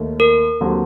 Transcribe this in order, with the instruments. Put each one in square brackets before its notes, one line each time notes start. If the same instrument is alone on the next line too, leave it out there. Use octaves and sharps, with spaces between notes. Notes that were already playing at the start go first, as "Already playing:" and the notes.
Already playing: [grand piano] D#2 D#3 A3
[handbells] A#4
[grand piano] D#2 D3 F#3 C4 G4